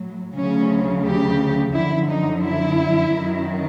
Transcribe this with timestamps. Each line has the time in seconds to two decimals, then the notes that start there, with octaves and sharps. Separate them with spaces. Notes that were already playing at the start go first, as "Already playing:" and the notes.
Already playing: A2 F#3
0.35 D2 C#3 F#3 C#4
1.05 G4
1.74 F#2 D3 F3 E4
2.08 D#4
2.43 E4
3.13 F#2 D#3 F#3